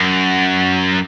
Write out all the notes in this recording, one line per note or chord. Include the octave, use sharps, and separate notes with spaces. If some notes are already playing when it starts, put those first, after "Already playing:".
Already playing: F#2